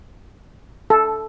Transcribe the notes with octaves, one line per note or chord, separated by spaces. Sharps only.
A4